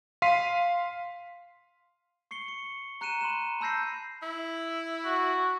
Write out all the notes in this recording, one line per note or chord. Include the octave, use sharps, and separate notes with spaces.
F5 C6 B6 C7 D#7
C#6 C7 C#7 G7
C#7
A#5 F#6 C#7 D#7 E7
B5 C6 F#6 E7
A5 B5 E6 G6 A#6 C7
E4
F#4